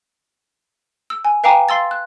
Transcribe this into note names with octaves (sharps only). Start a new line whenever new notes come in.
E6
G#5
B4 F5 G5 G#5 A#5 D6
F5 C6 E6 A6
F#6